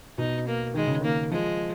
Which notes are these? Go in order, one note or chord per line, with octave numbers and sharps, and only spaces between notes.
B2 D#4
A#3
D#3 G#3
C#3
D#3 A#3
F3 G#3